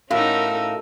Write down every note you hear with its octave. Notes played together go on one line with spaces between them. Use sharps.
A2 C#4 D#4 F#4 A#4 F5 E6